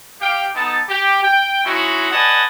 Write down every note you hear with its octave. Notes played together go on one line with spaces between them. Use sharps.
G4 F5 G5
B3 D#4 A4 A5
G4
G5
G#3 C#4 D#4 E4 F#4
B4 D5 D#5 F#5 G#5 A5